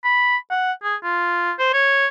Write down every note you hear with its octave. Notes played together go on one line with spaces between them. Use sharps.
B5
F#5
G#4
F4
C5
C#5